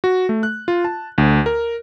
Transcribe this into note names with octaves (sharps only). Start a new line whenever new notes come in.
F#4
A3
F#6
F4
A5
D2
A#4